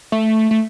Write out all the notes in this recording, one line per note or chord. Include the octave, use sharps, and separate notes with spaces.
A3
A3